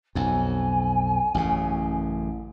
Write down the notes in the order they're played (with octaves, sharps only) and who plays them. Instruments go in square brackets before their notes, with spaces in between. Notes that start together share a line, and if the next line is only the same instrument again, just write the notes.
[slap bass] B1 F2 [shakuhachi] G#5
[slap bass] A1 F#2 C#3